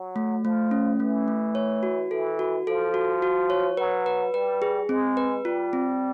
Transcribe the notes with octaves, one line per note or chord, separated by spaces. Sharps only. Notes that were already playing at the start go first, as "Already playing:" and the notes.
Already playing: F#3
A3
F3 A3
C#4
E3 A3
A3
C#5
F#4
E3 A4
F#4
F3 A4
F#4
F#4
C#5
F#3 B4
B4
G3 B4
G#4
G#3 C4
B4
G3 F4
C4